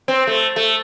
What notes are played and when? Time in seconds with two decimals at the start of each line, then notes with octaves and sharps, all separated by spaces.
0.08 C4
0.27 A3
0.56 A3